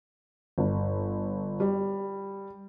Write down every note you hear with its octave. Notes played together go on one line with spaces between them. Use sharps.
G1
G3